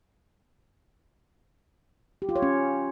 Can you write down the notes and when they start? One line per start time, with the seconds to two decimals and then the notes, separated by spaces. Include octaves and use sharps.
2.22 G4
2.29 F4
2.36 C#5
2.42 C#4